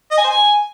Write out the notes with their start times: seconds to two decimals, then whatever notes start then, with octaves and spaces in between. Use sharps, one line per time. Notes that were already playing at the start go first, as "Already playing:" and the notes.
0.11 D#5
0.17 G#5
0.24 C5
0.30 G#5